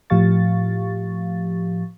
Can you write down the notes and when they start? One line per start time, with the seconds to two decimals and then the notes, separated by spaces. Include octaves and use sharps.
0.10 A2 F3 G4 F5 C#6 A6